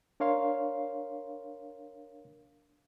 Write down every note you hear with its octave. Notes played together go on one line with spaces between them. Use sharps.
D4 A#4 C#5 F5 C6